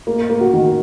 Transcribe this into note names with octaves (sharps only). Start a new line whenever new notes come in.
A#3
A#3
F#4
D#3